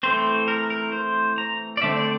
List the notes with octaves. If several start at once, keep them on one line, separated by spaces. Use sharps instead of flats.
E3 A3 C4 C5
A#4
A#4
C5
A#5
D5
D3 A3 C4 E5
D5